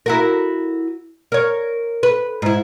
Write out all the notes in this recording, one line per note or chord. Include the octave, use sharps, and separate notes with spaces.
E4 F#4 A#4
A#4 C#5
B4
G#2 E4